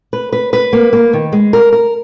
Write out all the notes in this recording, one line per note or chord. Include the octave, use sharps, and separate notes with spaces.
B4
B4
B4
A#3
A#3
D#3
G#3
A#4
A#4